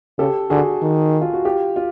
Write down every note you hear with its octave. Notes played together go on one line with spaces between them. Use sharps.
C#3 G4 A4
D3 F#4 G#4
D#3
F4
F#4
F4 G4
F4